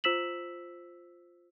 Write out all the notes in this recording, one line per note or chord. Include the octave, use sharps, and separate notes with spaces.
F4 C5 E6 B6 E7 F#7